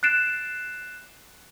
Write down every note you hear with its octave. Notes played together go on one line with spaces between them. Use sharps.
F#6 A6 C7 D7 E7